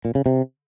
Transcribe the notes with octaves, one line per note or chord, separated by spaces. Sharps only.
A#2
C#3
C3